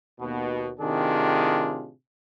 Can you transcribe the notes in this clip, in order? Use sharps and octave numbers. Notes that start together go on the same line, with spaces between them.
D#2 B2
A2 C3 D#3 D4 F4 G#4